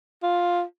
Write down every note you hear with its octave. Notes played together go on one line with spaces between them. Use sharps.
F4